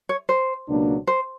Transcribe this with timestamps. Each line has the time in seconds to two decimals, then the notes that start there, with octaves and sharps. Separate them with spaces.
0.09 C#5
0.29 C5
0.68 C#2 B2 F#3 A#3 D4
1.07 C5